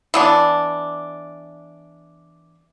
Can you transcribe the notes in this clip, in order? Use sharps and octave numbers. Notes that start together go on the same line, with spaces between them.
E3 B3 D4